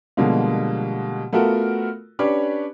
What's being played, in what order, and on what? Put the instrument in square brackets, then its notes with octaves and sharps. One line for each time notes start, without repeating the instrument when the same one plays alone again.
[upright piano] B2 D3 F3 G3 G#3 A#3
A3 B3 F4 F#4 A4 A#4
C#4 D4 G4 B4 C#5